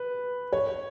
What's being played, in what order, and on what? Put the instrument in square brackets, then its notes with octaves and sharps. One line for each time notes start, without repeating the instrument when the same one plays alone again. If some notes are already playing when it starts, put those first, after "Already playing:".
Already playing: [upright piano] B4
C#5